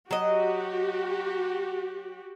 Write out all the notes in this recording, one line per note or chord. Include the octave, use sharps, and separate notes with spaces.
F#3 F#4 G4 D#5